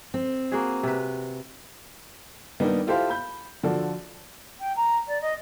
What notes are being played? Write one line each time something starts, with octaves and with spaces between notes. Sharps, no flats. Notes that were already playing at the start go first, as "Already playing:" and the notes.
C4
A#3 F#4 G#4
C3 B4
D#3 G3 A#3 B3 D4 D#4
E4 F4 G4 A4 C5 F5
B5 G6
D3 F3 F#4 A4 D5
G5
A#5
D5
D#5